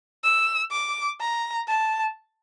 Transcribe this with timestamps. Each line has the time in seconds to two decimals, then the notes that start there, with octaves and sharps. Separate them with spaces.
0.24 E6
0.71 D6
1.20 A#5
1.68 A5